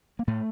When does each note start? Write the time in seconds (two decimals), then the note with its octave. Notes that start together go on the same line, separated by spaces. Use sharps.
0.19 A#3
0.27 A2 A3